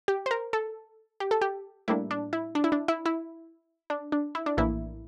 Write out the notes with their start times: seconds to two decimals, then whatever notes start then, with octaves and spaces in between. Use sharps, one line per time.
0.08 G4
0.26 C5
0.31 A#4
0.53 A4
1.20 G4
1.31 A4
1.41 G4
1.88 A2 G3 A#3 D4 E4
2.11 D4
2.33 E4
2.55 D4
2.64 E4
2.72 D4
2.88 E4
3.06 E4
3.90 D4
4.12 D4
4.35 E4
4.46 D4
4.57 A#1 A2 E3 A#3 D4 E4